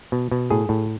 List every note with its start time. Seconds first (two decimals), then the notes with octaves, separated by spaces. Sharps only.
0.12 B2
0.31 B2
0.50 A2 G#4
0.69 A2